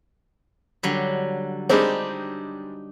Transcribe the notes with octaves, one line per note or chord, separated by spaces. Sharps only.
D3 F#3 G3
G3 G#3 C4 D4 D#4 G4